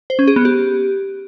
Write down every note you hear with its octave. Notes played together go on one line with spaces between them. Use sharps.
C5
C#4
G#4
B3
G4